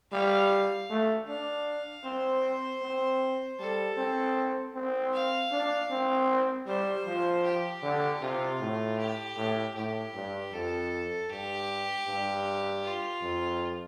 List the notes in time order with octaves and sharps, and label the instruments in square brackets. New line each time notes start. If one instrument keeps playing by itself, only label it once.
[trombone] G3 [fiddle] F5
[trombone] A3
[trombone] D4 [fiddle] F5
[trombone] C4 [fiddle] C5
[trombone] C4
[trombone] G3 [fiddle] A4
[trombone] C4
C4
[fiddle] F5
[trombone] D4
C4
[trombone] G3 [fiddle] C5
[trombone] F3
[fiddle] G4
[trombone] D3
[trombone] C3 [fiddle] F4
[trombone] A2
[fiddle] G4
[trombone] A2
[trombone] A2 [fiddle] G4
[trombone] G2
[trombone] F2 [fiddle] A4
[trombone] G2 [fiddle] G4
[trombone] G2
[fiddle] F4
[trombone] F2